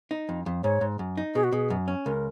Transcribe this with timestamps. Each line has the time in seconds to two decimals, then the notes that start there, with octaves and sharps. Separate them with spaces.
0.11 D#4
0.29 F2
0.46 F2
0.63 G#2 C#5
0.81 G#2
0.99 F#2
1.17 D#4
1.35 B2 G#4
1.44 F#4
1.52 B2 G#4
1.70 F#2
1.88 C#4
2.06 C#2 A#4